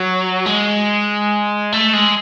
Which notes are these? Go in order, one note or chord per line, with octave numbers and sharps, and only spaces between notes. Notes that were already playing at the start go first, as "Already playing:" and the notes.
Already playing: F#3
G#3
A3
G#3